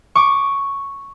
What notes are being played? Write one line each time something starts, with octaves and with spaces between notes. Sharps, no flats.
C#6 D6